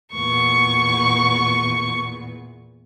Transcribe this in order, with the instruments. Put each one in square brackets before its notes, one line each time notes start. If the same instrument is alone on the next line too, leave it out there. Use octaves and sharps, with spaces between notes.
[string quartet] E2 A#2 B3 [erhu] C#6